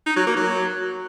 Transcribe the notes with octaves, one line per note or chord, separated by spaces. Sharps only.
D#4
F#3
A#3
F#3